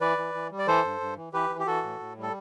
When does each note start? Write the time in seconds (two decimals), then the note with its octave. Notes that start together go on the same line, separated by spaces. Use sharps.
0.01 E3 B4 D5
0.18 E3
0.34 E3
0.51 G3
0.58 D5
0.67 E3 A4 C5
0.84 G2
1.01 G2
1.17 E3
1.33 E3 G4 B4
1.50 E3
1.59 G4
1.67 E3 F#4 A4
1.83 A2
1.99 A2
2.17 G3
2.23 A4